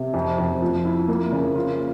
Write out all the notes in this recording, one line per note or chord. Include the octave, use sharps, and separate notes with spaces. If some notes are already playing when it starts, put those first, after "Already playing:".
Already playing: C3
F2
F2
F3
E4
A#3
C#3
F4